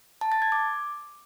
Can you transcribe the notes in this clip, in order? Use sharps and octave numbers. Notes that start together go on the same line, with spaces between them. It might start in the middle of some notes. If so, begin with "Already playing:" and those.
A5
A6
G#6
D6